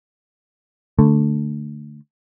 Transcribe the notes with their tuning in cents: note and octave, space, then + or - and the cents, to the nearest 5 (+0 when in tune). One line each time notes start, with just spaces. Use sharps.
D3 +0 A3 +0